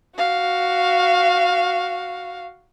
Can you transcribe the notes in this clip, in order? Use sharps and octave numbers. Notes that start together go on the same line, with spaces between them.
F#4 F5